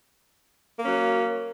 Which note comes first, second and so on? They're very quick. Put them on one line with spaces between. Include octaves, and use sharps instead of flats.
A#3 C#4 F#3